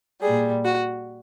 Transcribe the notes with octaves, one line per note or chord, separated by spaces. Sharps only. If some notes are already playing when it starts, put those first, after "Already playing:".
A#2 G3 G#4
F#4